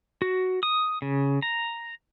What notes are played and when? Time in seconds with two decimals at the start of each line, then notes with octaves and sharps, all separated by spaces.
0.22 F#4
0.63 D#6
1.02 C#3
1.42 A#5